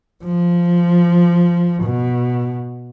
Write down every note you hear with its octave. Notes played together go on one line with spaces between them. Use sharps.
F3
B2